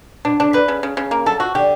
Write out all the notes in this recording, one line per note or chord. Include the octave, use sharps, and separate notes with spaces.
B2 D4
C#3 D4
D3 B4
C#3
C#3
C#3
A#3
F#3 A4
F3 F#4
D3 G4